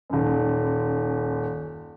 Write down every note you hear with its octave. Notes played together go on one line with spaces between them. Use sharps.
D#1 F#2